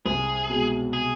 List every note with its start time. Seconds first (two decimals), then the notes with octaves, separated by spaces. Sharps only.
0.06 C2 G#4
0.49 B2 G#3
0.93 G#4